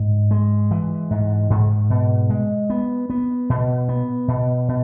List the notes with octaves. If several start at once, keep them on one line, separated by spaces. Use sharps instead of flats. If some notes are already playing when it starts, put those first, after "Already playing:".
Already playing: G#2
G#3
E3
G#2
G#2
B2
G#3
B3
B3
B2
B3
B2
B2